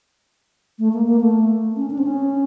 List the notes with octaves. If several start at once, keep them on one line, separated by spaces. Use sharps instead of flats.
A3
A#3
A#3
A3
C#4
D4
C4
C#4